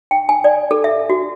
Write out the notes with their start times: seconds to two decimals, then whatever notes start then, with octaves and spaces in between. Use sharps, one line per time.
0.11 G5
0.29 G#5
0.44 D5
0.71 A4
0.84 E5
1.10 F#4